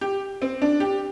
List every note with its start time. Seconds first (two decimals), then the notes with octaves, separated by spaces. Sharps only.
0.01 G4
0.42 C4
0.62 D4
0.80 G4